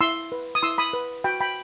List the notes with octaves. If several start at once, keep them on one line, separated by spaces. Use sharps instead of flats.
E4 C6 E6
B4
D#6
E4 C6 E6
B5 D#6
B4
F#4 G5 B5
G5 B5